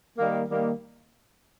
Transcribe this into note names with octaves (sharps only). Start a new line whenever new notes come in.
D#3 G3 A#3
D#3 G3 A#3